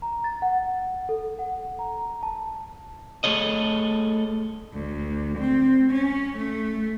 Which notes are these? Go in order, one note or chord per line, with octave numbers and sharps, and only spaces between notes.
A#5
A6
F#5
A4
F#5
A#5
A5
A3 G#4 A4 C#5 D#5
D2
C4
C#4
A3